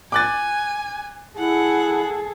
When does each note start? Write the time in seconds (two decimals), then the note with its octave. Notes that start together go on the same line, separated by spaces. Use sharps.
0.12 G#5 D6 F#6 A6
1.38 E4 G#4 A4 F#5